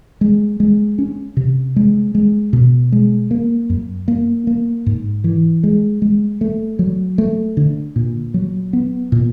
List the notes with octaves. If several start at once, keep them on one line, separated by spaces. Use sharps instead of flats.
G#3
G#3
C#4
C3
G#3
G#3
B2
G#3
A#3
F#2
A#3
A#3
G#2
E3
G#3
G#3
A3
F#3
A3
D3
A#2
F#3
B3
A#2